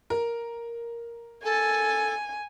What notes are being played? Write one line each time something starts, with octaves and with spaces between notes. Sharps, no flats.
A#4
A4 G#5